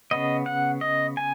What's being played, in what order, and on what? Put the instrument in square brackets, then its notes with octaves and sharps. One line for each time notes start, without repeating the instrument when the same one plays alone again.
[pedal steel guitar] C#3 B3 D#5
F#5
D#5
G#5